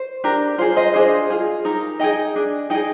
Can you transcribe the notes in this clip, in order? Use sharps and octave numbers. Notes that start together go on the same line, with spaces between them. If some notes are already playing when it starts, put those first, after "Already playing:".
Already playing: C5
D4 G4 A#4
F4 G#4 C5
C5 D#5
D4 F4 G#4 C5 D#5
F4 G#4
D#4 G4 A#4
D#4 G#4 D#5 G5
D4 G#4
D#4 G#4 D#5 G5